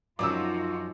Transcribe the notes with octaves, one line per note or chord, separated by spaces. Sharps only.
F#2 F3 D#4 F4 F#4 D6 E6